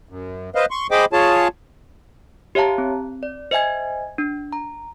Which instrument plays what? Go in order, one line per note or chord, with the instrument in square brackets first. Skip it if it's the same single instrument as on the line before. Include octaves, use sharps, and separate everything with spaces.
[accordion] F#2
B4 C5 D#5 F5
C6 C#6
G#4 C5 D#5 G5 B5 D6
F4 G#4 C#5 A5
[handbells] G4 C#5 E5 F5 A5 A#5
C4
D5
C5 D#5 E5 G#5 G#6
D4
A#5